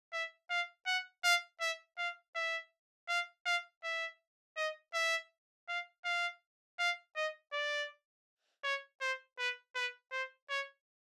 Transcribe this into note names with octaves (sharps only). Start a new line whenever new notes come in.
E5
F5
F#5
F5
E5
F5
E5
F5
F5
E5
D#5
E5
F5
F5
F5
D#5
D5
C#5
C5
B4
B4
C5
C#5